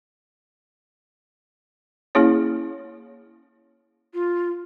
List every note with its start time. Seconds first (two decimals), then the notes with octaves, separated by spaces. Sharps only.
2.15 A#3 C#4 E4 G#4 C#5
4.14 F4